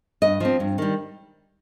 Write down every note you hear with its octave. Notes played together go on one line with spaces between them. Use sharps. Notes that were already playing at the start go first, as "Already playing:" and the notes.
G2 D#5
F3 C4
G2
D#3 G3